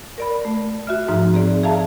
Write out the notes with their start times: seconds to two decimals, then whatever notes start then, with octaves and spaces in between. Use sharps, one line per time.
0.18 A#4 D5 B5
0.45 A3
0.87 F#4 E5 F6
1.08 G#2 F3 D#4 A#5
1.34 C4 G#4 D5
1.64 G#4 E5 F5 A5 A#5